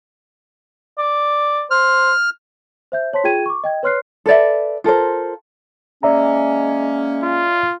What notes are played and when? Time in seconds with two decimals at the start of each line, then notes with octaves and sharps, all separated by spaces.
0.99 D5
1.71 C5 F6
2.92 C5 E5 G6
3.13 C5 C#5 A5 C6 B6
3.24 F4 G#4 G5 G#6 D#7
3.46 C#6 D6
3.64 D#5 G5 G#6
3.83 B4 C#5 C6 F6 F#6 C7
4.26 A4 B4 D5 E5
4.84 F4 A4 A#4 C5
6.03 G#3 A#3 C#4 D5 E5 A#5
7.23 F4